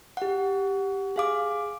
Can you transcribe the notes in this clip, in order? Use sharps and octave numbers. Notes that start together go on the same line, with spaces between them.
G4 F#5
G#4 F5 D6